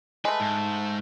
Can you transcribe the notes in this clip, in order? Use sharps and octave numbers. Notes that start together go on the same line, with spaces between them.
G#3 A3 B4
G#2